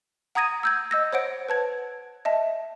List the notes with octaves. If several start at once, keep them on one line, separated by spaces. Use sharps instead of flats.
F#5 A#5 D#6 G#6 A#6 D#7
E6 G6 G#6
D#5 E6 A#6
C5 C#5 F#5 D7
B4 A5 G#6
D#5 E5 A5